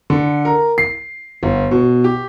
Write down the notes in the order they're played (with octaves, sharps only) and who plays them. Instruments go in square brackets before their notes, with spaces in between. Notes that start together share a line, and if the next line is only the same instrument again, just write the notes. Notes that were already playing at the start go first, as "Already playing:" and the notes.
[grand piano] D3
A#4
C7
G1
B2
G4